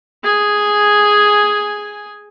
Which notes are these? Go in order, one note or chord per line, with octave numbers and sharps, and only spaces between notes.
G#4 G#5